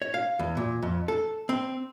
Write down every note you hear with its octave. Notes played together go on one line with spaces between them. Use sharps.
C#5
F5
E2
A#2
F2
A4
C4